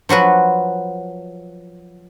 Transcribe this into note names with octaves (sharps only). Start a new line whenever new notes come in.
F3 F#3 F#4 B4